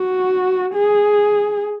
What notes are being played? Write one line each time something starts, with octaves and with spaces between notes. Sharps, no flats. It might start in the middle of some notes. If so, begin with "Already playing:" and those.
Already playing: F#4
G#4